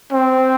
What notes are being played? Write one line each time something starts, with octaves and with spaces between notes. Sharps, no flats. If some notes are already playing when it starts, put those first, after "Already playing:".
C4